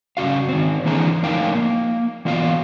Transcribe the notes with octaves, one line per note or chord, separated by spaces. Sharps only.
G2 C#3 F#4 F5
D#3 C4
D3 E3 A#3 E4 G#4 A#5
A2 F3 D#4 A#4 F5 G5
A#3
E3 B3 F4 F#4 F5